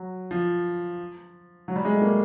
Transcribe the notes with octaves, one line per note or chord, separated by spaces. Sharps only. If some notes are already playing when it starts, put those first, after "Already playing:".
Already playing: F#3
F3
F#3
G3
G#3
A3
A#3